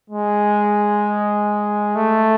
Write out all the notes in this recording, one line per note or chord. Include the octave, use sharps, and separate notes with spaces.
G#3
A3